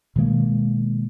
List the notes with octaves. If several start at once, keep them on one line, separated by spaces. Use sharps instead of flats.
B2 D#3 G#3 A#3